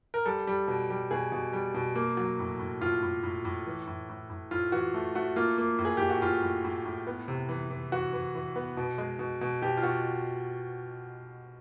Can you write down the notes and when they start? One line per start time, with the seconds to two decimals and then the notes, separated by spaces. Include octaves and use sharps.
0.14 A#4
0.26 G3 A4
0.47 G3
0.68 B2
0.90 G3
1.11 B2 G#4
1.32 B2
1.53 G3
1.74 B2
1.95 A#3
2.17 F#3
2.39 A2
2.59 A2
2.81 A2 F4
3.03 A2
3.23 A2
3.45 A2
3.67 E3
3.87 A2
4.09 A2
4.30 A2
4.51 A2 F4
4.72 E3 F#4
4.94 A3
5.15 A3 F#4
5.36 A#3 F4
5.58 A#3
5.78 A2
5.85 G#4
5.97 A2 G4
6.10 F#4
6.22 A2 F4
6.42 A2
6.64 A2
6.85 A2
7.07 B3
7.28 C3
7.49 E3
7.70 E3
7.92 E3 F#4
8.13 E3
8.35 E3
8.56 B3
8.77 B2
8.98 G#3
9.19 B2
9.41 B2
9.62 B2 G4
9.77 F4
9.83 B2 F#4